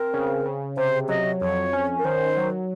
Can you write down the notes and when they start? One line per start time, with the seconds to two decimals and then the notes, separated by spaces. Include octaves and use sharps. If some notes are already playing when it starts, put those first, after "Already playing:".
Already playing: C4 A#4
0.14 C#3
0.45 C#3
0.77 C3 C5
1.09 F#3 D#5
1.41 F2 C#5
1.73 C#4
1.99 A#4
2.05 D#3 C5
2.37 F#3